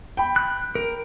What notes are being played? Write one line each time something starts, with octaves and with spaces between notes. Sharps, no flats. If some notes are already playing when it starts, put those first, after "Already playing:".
G5 B5
F#6
A#4